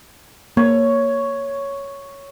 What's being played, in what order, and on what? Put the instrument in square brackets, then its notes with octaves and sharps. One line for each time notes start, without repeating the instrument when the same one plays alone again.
[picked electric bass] A#3 [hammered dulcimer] C#5